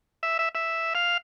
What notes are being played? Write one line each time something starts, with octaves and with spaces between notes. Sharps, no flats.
E5
E5
E5
F5